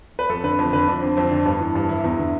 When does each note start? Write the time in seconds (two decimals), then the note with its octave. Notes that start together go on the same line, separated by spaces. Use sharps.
0.19 B4
0.29 F2 A4
0.44 D3 B4
0.59 F2
0.73 D3 B4
0.88 F2 D4
1.02 D3 C4
1.17 F2 C4
1.31 D3 D4
1.46 G2 B3
1.60 E3
1.75 G2 D4
1.89 E3 E4
2.04 E2 E4
2.19 D3